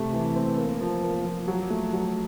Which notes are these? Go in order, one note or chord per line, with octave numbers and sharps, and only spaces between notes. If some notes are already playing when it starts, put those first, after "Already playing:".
Already playing: C3 A3
E3
C4
A#3
F3
A#3
F3
F#3
A3
F#3